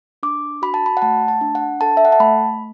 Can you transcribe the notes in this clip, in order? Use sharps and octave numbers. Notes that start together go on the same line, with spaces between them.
D4 D6
F#4 B5
A5
B5
F#5
A3 A5
A5
D4
F#5
A4 A5
E5
F#5
A5
A3 B5